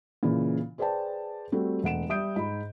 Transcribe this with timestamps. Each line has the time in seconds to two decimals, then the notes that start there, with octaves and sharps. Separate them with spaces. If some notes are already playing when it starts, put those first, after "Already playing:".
0.23 A#2 C#3 E3 E4
0.78 G#4 B4 C5 D5 G5 A5
1.52 G3 A3 C4 F#4
1.83 E1 A3 F#5 D7 E7
2.09 G3 E5 D#6 G6 D7
2.36 G#2 B5